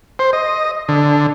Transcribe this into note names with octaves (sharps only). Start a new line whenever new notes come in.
C5
D#5
D3